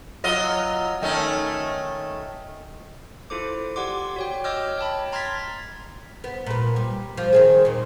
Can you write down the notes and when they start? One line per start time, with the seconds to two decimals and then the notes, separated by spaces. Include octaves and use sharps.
0.24 F#3 F4 D#5
1.01 D#3 A3 C#4
3.30 E4 F4 A4 C5 D6
3.76 G4 D5 F#5 C6 D6
4.16 F#4 C#5 G5
4.44 C#5 D#5 D6 E6 F6 G6
4.78 C#5 G5 A5 B5
5.12 A#5 C6 F6 G#6 A6 B6
6.24 B3
6.46 A#2 B4
6.76 G3
7.17 F3
7.33 D#3 C4 G#4
7.65 D#2 A#2